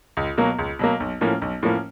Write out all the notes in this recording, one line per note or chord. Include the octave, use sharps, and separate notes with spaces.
C#2
B2 F#3 A#3
C#2
B2 F#3 A#3
B1
A2 F3 A#3 C#4
B1
A2 F3 A#3 C#4